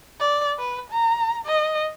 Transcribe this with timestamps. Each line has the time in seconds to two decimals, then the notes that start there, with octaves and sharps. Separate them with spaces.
0.20 D5
0.59 B4
0.90 A#5
1.46 D#5